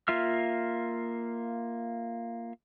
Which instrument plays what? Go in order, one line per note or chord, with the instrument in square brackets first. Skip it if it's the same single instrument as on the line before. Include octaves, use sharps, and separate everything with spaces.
[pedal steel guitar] A#3 F4 E5 F6